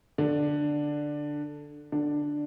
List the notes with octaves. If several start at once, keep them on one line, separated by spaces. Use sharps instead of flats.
D3 D4
D3 D4